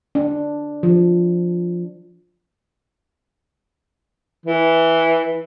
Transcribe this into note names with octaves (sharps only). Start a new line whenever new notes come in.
D4
F3
E3